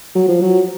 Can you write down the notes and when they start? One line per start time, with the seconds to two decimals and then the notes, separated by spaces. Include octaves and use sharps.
0.15 F#3
0.28 F3
0.42 F#3